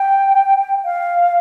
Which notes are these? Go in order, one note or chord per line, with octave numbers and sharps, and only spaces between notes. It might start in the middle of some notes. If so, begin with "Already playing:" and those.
Already playing: G5
F5